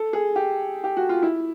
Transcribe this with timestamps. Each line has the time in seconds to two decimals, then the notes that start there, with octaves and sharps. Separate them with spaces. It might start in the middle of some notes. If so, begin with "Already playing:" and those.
Already playing: A4
0.13 G#4
0.36 G4
0.84 G4
0.97 F#4
1.09 F4
1.22 E4